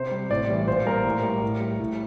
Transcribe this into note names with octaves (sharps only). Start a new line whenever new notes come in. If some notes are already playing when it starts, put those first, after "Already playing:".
Already playing: C3 C5
G3
A2 D5
E3 G3
A#2 C5
G3 A#4
A2
G3
A2
G3
A2